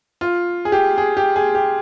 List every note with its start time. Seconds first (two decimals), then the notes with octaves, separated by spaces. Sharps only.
0.21 F4
0.65 G#4
0.72 G4
0.98 G#4
1.17 G4
1.36 G#4
1.55 G4